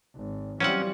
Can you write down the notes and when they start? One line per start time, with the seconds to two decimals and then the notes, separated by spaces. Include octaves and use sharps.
0.15 G#1
0.60 E3 F#3 G3 C4 C#4 F4 F#5